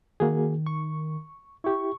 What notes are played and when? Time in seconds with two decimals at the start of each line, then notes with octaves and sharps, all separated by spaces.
0.20 D#3 A#3 F#4 G#4
0.66 C#6
1.64 E4 G4 C#6